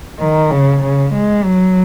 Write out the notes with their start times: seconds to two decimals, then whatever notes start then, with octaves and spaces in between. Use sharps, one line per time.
0.19 D#3
0.51 C#3
0.82 C#3
1.13 G#3
1.44 F#3